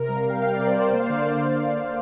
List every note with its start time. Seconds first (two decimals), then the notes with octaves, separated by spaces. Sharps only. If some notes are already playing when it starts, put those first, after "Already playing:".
Already playing: C3 A#4
0.08 G3
0.16 F5
0.25 C3 G5
0.42 G3 F5
0.54 D5
0.59 C3
0.67 C5
0.76 G3 D5
0.93 A#3 C5
0.99 F5
1.05 D3 D5
1.18 C5